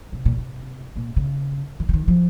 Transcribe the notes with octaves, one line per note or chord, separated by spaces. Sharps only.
C3
A#2
C3
A#2
C#3
D#3
C#3
D#3
F3